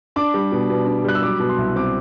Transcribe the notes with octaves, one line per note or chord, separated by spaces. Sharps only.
D4 D6
G3
B2
B2
D4
G3 F#6
E6
F#3 D6
B2
C6
C2
C4 D6